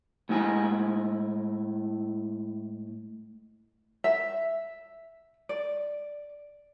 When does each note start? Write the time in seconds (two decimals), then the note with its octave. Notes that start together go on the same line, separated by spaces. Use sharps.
0.29 A2 G#3 E4 G#5
4.04 E5
5.49 D5